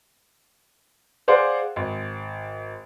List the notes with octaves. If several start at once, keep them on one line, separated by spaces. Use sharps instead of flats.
G#4 C5 D5 F5 F#5
G#1